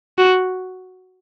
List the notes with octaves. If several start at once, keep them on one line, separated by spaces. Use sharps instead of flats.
F#4